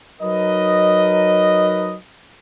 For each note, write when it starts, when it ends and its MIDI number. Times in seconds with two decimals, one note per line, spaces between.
0.22 1.95 54
0.22 1.95 63
0.22 1.95 70
0.22 1.95 71
0.22 1.95 75